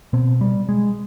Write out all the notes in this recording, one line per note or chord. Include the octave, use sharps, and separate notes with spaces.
B2 C4
G3
G#3